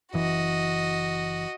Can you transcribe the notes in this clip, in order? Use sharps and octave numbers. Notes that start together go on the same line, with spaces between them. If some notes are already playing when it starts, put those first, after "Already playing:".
F#1 E3 F#4 D#5